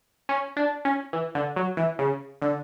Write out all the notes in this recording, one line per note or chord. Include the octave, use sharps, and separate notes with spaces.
C#4
D4
C#4
E3
D3
F#3
E3
C#3
D3